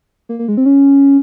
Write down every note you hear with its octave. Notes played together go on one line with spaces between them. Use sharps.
A#3
A#3
G#3
C4
C#4